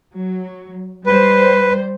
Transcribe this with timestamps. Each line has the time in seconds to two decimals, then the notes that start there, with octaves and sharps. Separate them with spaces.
0.14 F#3
1.06 G3 B4 C5